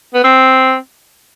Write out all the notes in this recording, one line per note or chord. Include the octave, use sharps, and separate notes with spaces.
B3
C4